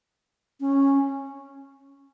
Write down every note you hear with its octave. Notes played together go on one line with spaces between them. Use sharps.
C#4